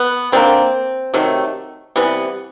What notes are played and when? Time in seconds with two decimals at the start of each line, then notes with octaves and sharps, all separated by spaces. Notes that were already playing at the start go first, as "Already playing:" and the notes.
Already playing: B3
0.32 D3 G3 A#3 C4
1.14 C3 D#3 F#3 A3
1.96 C3 E3 G3 B3